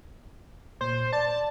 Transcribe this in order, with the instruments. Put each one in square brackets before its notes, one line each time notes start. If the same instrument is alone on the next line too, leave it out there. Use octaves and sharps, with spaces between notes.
[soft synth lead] A#2 [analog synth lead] C5
[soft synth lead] D5 [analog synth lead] A5